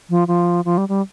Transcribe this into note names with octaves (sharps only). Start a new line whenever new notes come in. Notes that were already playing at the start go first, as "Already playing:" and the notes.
F3
F3
F3
G3
G3